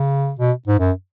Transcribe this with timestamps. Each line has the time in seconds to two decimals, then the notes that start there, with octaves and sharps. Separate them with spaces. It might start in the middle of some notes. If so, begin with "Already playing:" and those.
Already playing: C#3
0.39 B2
0.67 G#2
0.79 F#2